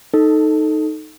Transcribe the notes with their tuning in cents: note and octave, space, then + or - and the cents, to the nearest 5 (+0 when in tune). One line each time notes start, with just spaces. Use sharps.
D#4 +0 A4 +0